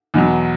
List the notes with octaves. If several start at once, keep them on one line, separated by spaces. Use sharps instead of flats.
E2 B2 F#3